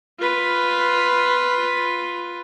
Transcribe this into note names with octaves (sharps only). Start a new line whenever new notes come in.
F4 B4